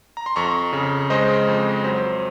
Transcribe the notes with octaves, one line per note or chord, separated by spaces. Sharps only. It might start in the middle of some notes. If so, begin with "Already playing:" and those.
A#5
C6
F2 A#5 C#6
C#3
G#3 C5 D#5
F2
F#3 C5
C5